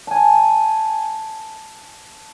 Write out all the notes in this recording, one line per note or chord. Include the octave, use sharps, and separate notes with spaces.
G#5 A5